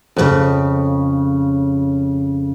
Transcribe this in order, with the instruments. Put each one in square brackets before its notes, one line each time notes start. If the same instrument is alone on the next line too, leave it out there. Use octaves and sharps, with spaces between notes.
[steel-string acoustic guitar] F2 A2 C#3